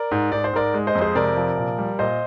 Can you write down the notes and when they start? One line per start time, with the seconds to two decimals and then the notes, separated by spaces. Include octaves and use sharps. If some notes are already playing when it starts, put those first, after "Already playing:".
Already playing: A#4 D5
0.11 G#2
0.32 G#2 D5
0.44 C5
0.53 G#2 A#4 D5
0.74 G#3
0.87 C5 D#5
0.95 F2
1.01 G#4 C5
1.15 C3 A#4 D5
1.37 F3
1.58 A#2
1.78 G3
1.99 A#2 C5 D#5